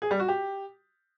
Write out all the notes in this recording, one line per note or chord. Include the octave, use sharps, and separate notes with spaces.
G#4
G3
F#4
G4